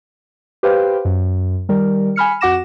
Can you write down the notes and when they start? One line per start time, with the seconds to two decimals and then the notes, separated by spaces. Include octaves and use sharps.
0.63 G4 B4 C5 F5 G5
1.05 F#2
1.69 D#3 G3 A#4
2.16 G#5 B5 F6 C#7
2.41 F2 F#4 F#5 D6 A#6 E7